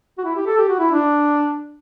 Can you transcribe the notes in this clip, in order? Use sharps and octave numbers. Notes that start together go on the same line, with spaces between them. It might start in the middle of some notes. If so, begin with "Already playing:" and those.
F#4
E4
G4
A4
G4
F#4
E4
D4